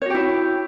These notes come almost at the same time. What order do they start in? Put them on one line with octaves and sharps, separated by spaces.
C#5 F#4 G4 E4